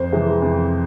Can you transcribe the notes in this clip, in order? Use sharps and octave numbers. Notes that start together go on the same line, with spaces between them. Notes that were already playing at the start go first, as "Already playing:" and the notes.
Already playing: F2 C5
C3 E3 G#3
F2